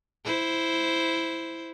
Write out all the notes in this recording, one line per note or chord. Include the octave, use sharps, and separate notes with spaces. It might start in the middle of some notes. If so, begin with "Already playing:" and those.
E4 C5